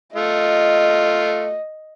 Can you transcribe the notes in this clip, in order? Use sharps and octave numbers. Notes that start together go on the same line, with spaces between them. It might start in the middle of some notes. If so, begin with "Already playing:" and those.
A3 F4 D#5